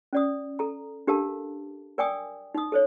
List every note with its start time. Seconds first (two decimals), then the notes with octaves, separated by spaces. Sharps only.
0.13 C#4 D5 D#6
0.59 A4 A#5
1.07 D4 G4 A4 A#4 F5 A5
1.98 A#4 D5 G5 G#5 D6 D#6
2.55 D#4 D#6
2.72 A4 C5 C#5